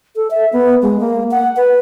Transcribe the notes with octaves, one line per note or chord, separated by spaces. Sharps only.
A4
E5
B3
G#3
A#3
F#5
B4